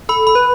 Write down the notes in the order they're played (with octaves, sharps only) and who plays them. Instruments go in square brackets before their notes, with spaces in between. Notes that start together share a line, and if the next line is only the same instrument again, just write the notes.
[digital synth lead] A4 [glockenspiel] B5
[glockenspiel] B5
[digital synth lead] B4